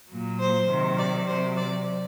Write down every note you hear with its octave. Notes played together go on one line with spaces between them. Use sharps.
A#2 F#3
C5
C3 D#3 F#3
D5
C3 F#3 C5
D5